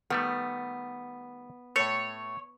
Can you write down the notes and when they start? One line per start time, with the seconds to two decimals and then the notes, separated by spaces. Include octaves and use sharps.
0.10 D#3 G3 A3 B3
1.76 A2 A3 C#5